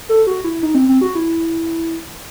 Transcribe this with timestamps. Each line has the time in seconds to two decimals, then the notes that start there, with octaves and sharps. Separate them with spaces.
0.09 A4
0.27 F#4
0.44 E4
0.62 D#4
0.75 C4
0.89 C4
1.01 F#4
1.15 E4